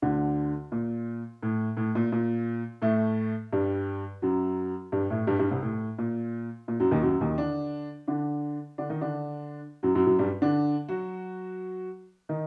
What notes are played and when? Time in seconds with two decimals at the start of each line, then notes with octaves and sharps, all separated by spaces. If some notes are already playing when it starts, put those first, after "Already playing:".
0.02 D2 D3
0.72 A#2
1.43 A2
1.77 A2
1.95 A#2
2.12 A#2
2.82 A2 A3
3.53 G2 G3
4.22 F#2 F#3
4.92 G2 G3
5.10 A2 A3
5.27 G2 G3
5.39 G2 G3
5.51 C2 C3
5.63 A2
5.98 A#2
6.68 A#2
6.80 F#2 F#3
6.91 D#2 D#3
7.03 F#2 F#3
7.21 D#2 D#3
7.38 D3 D4
8.07 D3 D4
8.78 D3 D4
8.90 D#3 D#4
9.01 D3 D4
9.83 F#2 F#3
9.95 F#2 F#3
10.06 F#2 F#3
10.19 G2 G3
10.42 D3 D4
10.88 F#3 F#4
12.29 D#3 D#4